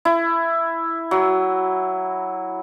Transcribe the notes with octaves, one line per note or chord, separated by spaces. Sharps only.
E4
F#3